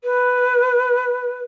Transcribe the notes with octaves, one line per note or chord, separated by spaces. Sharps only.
B4